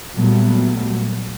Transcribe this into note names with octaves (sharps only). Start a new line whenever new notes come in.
A#2 F#3 G3 A3 B3